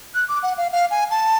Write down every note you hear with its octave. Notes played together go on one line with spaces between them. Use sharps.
F#6
D6
F#5
F5
F5
G#5
A5